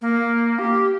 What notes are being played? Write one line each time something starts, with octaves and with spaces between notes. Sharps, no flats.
A#3
G4